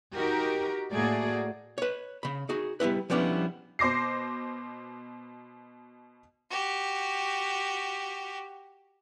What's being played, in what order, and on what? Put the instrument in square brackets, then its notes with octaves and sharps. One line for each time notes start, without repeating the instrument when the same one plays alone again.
[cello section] D#4 F#4 G4 A#4
A2 A3 A#3 F#4 G#4 D5
[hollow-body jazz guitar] B4 C#5
C#3 B5
D#4 F#4 G#4
G3 B3 E4 B4
F3 G3 B3 C#4 D4 E4
[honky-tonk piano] B2 C5 D6 A#6 C7
[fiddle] F#4 G4